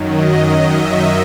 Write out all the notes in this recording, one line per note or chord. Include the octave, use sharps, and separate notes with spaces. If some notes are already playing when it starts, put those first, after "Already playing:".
Already playing: F#2 D#3 F#3
D#5
D#5
E5